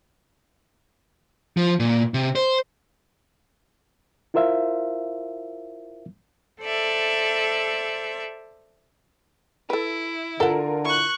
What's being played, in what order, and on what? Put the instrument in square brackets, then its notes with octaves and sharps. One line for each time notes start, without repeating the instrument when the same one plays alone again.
[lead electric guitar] F3
A#2
C3
C5
[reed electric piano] E4 F4 A#4 C5 E5 F5
[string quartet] A4 C5 D5 E5
[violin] E4 [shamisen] A4 B4
[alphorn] D3 [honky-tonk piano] F4 A#4 [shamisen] A4 F#5
[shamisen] E4 [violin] C#6 F#6